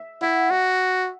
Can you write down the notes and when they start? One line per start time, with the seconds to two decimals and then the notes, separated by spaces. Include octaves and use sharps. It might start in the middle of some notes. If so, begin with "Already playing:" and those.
Already playing: E5
0.21 E4 F#5
0.50 F#4 E5